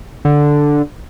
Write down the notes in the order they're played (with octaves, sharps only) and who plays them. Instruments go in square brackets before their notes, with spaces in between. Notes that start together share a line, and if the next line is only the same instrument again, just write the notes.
[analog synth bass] D3